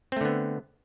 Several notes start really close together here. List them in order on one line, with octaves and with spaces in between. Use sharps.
C4 A3 D3 B3